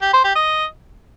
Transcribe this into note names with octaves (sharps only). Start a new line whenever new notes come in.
G4
C5
G4
D#5